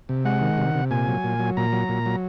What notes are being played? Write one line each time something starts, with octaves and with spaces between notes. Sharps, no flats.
C3
G#3 F#5
D#3
C3
C3
A#2 G#5
F#3
A#2
F#3
A#2 A#5
F#3
A#2
F#3